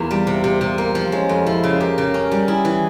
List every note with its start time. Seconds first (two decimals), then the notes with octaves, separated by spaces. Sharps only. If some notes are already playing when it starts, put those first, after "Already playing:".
Already playing: E2 A#3 F4
0.11 G3
0.27 C3
0.44 C3
0.61 C3
0.78 A#3
0.95 F3
1.12 G#3 C#4
1.29 F2
1.46 F3 E4
1.63 C#3
1.80 G4 A#4
1.98 C#3
2.14 C#4
2.31 G3
2.48 E4 G#4
2.65 E3